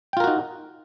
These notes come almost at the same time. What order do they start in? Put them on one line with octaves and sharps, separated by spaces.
G5 F4 A#4 F#4 D#4